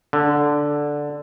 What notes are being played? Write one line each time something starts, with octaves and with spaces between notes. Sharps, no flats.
D3